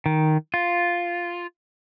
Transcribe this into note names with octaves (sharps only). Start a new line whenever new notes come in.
D#3
F4